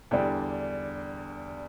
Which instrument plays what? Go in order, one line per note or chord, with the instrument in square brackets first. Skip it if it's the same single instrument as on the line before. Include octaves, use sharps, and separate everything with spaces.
[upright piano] E2 D3 G3 D4 G4